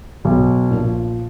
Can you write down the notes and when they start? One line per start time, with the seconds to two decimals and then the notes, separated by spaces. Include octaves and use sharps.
0.25 B1
0.71 A#2 F3